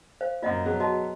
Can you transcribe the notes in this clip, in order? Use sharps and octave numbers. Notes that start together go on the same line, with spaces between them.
C5 F5
F#2 A#2 F4 D#5 F#5
B2 F#3 B3 G#4
F#4 D#5 A5